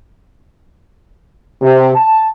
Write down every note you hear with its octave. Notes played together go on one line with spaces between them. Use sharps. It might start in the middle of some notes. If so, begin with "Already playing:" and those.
C3
A5